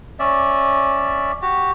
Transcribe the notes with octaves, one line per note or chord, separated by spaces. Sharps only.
C#4 D5 E5
F#4 G4